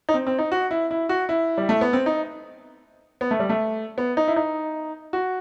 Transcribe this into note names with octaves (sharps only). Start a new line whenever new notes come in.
D#4
C4
C4
D#4
F#4
E4
E4
F#4
E4
G3
A3
B3
C4
D#4
B3
A3
G3
A3
B3
D#4
E4
D#4
F#4